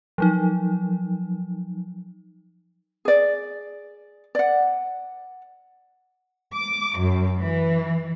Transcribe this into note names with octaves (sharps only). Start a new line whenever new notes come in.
F3 F#3 D#4
G#4 D5
D5 F#5
D6
F#2
E3